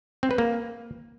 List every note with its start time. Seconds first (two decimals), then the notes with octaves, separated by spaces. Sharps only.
0.23 C4
0.31 B4
0.38 A#3